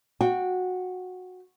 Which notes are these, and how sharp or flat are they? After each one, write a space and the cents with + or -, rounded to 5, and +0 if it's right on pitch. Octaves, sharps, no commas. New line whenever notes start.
F#4 -15 G5 +0